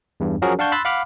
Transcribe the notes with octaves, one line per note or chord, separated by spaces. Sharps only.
E2 G2
F3 F#3 C#4 F#4 G#4 A#4
D4 F5 F#5 A5 C#6 G6
B5 C6 E6 F#6 A6
F5 F#5 B5 D6 F6